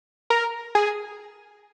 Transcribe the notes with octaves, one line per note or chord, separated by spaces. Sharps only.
A#4
G#4